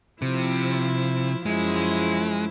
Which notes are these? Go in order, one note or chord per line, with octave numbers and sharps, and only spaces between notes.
C3 F3 E4
F#2 F3 G#3 E4